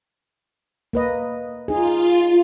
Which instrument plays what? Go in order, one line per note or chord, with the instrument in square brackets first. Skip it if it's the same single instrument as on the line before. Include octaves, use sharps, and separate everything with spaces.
[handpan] A#3 B4 D#5
[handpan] D#4 G#4 [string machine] F4